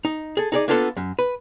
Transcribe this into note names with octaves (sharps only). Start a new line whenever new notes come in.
D#4
G#4 A4
D#4 G#4 D5
A#3 B3 D4 F4 G4 A4
F#2
B4